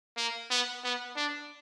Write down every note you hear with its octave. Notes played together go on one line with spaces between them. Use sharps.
A#3
B3
B3
D4